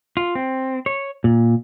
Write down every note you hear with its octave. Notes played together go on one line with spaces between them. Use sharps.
F4
C4
C#5
A#2